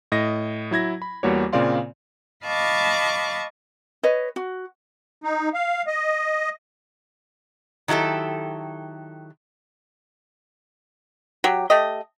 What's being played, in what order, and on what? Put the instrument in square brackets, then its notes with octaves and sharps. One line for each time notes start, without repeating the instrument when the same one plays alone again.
[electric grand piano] A2 D#5 A#6
F#3 E4 G#6 A#6
B5
E2 G3 A#3 F#4 G4 C#5
A#2 C#3 C4 D5 F5 C6
[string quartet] D#5 F5 A5 B5 C#6 D6
[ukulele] B4 C#5 D#5
F#4
[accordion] D#4
F5
D#5
[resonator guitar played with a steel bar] D#3 F#3 E4 G4 A4
[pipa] F#3 G4
A3 G4 D#5